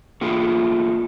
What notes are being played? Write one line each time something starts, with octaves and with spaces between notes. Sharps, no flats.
A3 A#3 F4 G#4